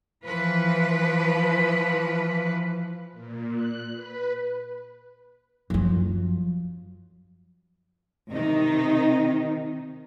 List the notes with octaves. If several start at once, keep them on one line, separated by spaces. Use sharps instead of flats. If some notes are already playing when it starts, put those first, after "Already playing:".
E3 F3 B4
A#2
F#6
B4
F#2 F3
C3 D#3 D#4